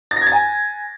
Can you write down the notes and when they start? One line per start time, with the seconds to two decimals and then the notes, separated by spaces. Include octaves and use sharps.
0.11 A6
0.16 A#6
0.21 G#6
0.27 A6
0.32 G#5